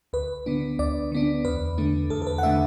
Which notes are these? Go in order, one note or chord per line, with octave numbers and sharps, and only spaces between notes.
D2 B4
D3 B3 D4
D2 D5
D3 B3 D4
E2 B4
D3 A3 D4
E2 A4
A4
B4
F#5
D3 A3 D4 E5